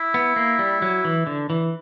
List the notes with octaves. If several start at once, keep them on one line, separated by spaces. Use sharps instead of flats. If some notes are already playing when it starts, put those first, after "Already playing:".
Already playing: E4
B3
A#3
G3
F#3
E3
D3
E3